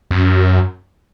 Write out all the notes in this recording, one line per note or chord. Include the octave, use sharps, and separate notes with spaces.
F#2